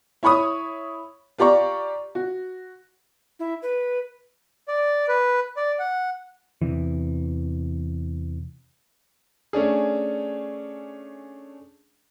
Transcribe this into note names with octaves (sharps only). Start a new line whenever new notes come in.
E4 C#5 B5 C#6 D#6
F4 G4 D5 A#5 C#6
F#4
E4
B4
D5
B4
D5
F#5
E2 C3 E3
A3 C#4 D4 G#4